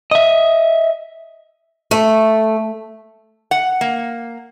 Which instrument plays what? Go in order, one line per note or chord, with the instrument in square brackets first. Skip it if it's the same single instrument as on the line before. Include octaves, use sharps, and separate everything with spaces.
[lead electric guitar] D#5 E5
[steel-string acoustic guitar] A3
[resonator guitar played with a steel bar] F#5
A#3